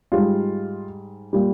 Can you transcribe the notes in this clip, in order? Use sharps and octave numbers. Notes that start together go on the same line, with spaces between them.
G#2 G3 F4
A#2 G3